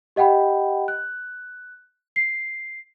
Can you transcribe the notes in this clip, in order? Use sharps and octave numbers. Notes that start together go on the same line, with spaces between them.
G4 D#5 F#5 G5 B5
F#6
C7